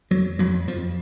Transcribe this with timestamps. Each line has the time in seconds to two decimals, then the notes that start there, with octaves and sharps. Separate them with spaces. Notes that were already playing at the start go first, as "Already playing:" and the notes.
0.11 F2 F#3
0.39 F2 F#3
0.67 F2 F3